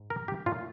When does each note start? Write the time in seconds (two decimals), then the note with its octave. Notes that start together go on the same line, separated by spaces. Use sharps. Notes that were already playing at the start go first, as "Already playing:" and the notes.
Already playing: G#2
0.10 A#4
0.28 G4
0.46 A#2 F#3 A3 F4